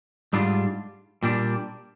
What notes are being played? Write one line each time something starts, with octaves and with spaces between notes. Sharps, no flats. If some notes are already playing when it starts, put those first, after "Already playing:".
G#2 G3 D4 F4
A#2 G3 D4